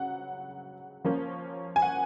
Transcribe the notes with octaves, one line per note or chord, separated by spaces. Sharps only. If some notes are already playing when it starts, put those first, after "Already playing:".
Already playing: C#3 F#3 F#5
F3 A#3 C#4
G#5
F#5